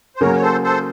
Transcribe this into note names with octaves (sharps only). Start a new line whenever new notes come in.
C5
C#3 F#3 A#3 A#4 C#5
C#5
A4 C5
A4 C5